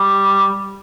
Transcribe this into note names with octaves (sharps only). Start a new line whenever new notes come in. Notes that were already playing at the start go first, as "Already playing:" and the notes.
Already playing: G3